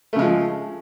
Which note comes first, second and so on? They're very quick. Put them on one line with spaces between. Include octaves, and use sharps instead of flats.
A3 C#3 G#3 F3